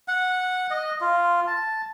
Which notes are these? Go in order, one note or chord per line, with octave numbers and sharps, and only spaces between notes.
F#5
D#5
F4
A5